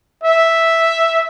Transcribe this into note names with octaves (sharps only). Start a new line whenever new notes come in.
E5